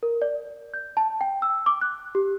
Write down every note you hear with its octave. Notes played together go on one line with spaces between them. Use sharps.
A#4
D5
G6
A5
G5
E6
D6
F#6
G4